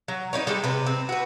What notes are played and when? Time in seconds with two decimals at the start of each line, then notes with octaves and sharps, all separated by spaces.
0.08 F#3
0.33 D4 D#4 B4 C#5
0.47 G3 G#3 G4 A4
0.64 C3 B4
0.86 C4
1.09 F#4 B4